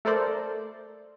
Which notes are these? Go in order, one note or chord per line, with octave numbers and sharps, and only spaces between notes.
A3 A4 A#4 C5 D5